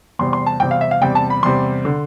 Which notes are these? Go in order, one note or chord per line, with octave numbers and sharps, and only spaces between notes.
E2 C3 G3 C4 C6
C6
A5
E2 C3 G3 C4 G5
F5
E5
F5
E2 C3 G3 C4 G5
A5
B5
E2 C3 G3 C4 C6
D3